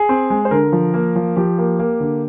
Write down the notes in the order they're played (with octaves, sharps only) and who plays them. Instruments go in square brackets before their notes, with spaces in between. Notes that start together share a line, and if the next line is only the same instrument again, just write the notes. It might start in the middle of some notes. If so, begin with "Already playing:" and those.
Already playing: [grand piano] G#4
C4
G#3
C5
D3 A#4
F3
A#3
F3
F3 G4
A#3
A#3
D3